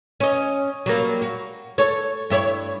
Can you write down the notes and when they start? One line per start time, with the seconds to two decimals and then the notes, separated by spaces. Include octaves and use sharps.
0.20 C#4 D#5
0.86 F#3 G3 A#3
1.22 F#4
1.78 A4 C#5
2.30 G2 E4 C#5